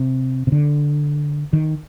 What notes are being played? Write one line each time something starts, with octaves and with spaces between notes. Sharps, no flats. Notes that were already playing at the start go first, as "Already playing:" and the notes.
Already playing: C3
C3
D3
D#3